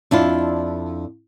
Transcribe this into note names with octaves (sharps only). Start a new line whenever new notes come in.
F2 D4 E4 F4